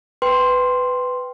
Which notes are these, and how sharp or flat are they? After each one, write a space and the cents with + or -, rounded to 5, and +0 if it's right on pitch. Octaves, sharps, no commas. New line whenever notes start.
B4 +15 G5 +0 C6 +0